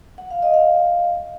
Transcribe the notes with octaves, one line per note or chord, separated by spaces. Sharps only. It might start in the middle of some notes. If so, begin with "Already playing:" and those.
F#5
F5
D#5
F5